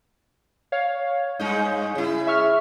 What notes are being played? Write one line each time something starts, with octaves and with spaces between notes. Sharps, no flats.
C#5 F5
G2 G#3 D#4
C#3 E4
E5 C#6 F6